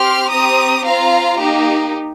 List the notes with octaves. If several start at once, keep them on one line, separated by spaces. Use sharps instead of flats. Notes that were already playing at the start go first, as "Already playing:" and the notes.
Already playing: C4 G4 C6 F6
C4 G4 A#5 D#6
C4 F4 F5 A#5
A#3 D#4 G4